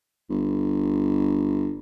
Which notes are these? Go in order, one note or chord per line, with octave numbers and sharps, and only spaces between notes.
G1